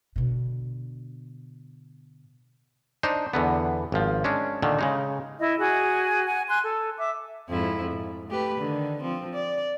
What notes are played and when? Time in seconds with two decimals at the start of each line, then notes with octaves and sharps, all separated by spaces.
0.16 B2 D3
3.03 D4 D#4 C5
3.33 E2 D3 B3
3.92 G#1 F3
4.24 G#3 C#4 D4
4.62 A#2 D3 D#3
4.79 C#3 G#3 D#4
5.39 E4 D#5
5.59 F#4 G#4 G#5
6.26 F#5 G#5
6.48 G#5 C6 F#6
6.64 A4
6.98 E5 D6
7.49 F2 G#2 E4
7.92 G#2
8.29 A3 G4 B4
8.58 D3 D#3
9.01 F3 C4
9.34 D5